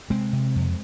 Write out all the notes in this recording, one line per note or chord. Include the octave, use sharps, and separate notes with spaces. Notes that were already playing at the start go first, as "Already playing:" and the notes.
C3 G#3 C4
C3
F2